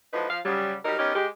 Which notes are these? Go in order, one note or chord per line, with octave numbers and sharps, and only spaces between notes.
A2 F3 F#3 D#4 B4
F3 F5
C#3 F#3 G3
F#3 G3 D#4 A#4
B3 C#4 D#4 G4 A#4 C#5
G#3 G4